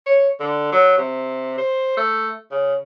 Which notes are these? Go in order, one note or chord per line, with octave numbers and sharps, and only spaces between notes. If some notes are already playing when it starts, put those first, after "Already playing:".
C#5
D3
F#3
C3
C5
A3
C#3